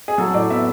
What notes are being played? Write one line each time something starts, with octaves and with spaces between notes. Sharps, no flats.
G#4
F#3 A4
A2 D5
B3 E5